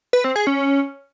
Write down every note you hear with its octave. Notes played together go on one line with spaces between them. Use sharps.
B4
C4
G#4
C#4